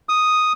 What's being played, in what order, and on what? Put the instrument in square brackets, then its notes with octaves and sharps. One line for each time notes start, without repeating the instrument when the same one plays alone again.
[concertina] D#6